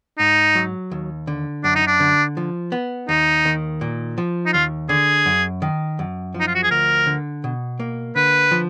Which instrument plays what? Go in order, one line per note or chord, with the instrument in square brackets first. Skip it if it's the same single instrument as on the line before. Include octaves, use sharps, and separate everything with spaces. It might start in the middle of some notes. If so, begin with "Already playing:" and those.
[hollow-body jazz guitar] G#2 [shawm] D#4
[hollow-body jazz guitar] F#3
D#2
D3
[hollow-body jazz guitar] F#2 [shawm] D4
[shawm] D#4
D4
[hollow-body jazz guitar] D3
F3
B3
[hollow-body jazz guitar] D#2 [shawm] D#4
[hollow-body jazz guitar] D#3
A#2
F3
[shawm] D#4
[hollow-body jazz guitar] D#2 [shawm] F4
[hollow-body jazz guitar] D3 [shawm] G#4
[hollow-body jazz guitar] F#2
D#3
F#2
F3
[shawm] D#4
F4
F#4
G#4
[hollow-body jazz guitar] D2 [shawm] A#4
[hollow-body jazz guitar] D3
B2
A#3
[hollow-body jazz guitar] D3 [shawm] B4
[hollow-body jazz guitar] F3